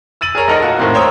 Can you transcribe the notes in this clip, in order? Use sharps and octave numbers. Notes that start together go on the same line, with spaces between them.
E6 A6 D#7 F#7
G#4 A#4 C#5 A#5
A#1 D#4 A4 A#4 D#5
A#3 F4 F#4
D#2 A2 D#3 A#3 C4
C5 C#5 G5 A#5 D#6 E6